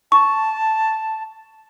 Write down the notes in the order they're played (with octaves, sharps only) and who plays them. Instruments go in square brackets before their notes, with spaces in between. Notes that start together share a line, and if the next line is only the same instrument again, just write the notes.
[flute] A5 [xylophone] C#6